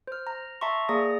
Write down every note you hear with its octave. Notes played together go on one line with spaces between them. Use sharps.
C5 F6
A#5
E5 A5 A#5 C6 C#6
A#3 G#4 D5 A#5 D#6 A#6